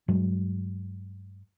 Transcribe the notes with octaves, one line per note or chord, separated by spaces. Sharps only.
G2 F#3 G#3